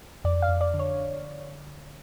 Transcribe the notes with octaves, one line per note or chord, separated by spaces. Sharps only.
F2 D5
F5
F2
D5
D3
C#5